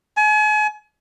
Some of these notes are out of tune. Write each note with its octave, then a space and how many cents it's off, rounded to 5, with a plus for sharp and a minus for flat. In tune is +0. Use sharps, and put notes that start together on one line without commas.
G#5 +40